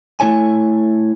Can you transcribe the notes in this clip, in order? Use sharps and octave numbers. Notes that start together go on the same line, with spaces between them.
A3 E4 C#5 G#5